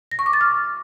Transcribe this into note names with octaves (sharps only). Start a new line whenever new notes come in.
A#6
C#6
D6
A6
F6